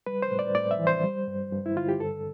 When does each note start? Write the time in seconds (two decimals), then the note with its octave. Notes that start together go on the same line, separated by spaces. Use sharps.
0.06 G3 B4
0.22 C5
0.31 A2
0.39 D5
0.55 A2 D5
0.71 E5
0.79 E3
0.87 C5
1.03 G3
1.28 G2
1.52 G2
1.66 E4
1.76 D3 F4
1.89 G4
2.00 G2 A4